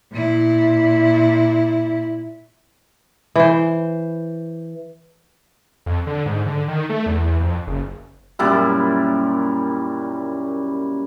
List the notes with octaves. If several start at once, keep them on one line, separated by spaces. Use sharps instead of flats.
A#2 E4
E3 C5
F2
D3
G#2
D3
D#3
A3
E2
F2
F#1
F#2 A#2 G3 E4